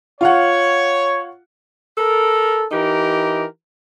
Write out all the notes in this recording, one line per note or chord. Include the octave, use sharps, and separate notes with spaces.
F4 C#5 F5 F#5
A4 A#4
E3 D#4 G4 A#4